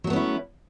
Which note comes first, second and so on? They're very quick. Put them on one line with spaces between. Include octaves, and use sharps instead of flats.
F#3 A3 B3 C#4 E4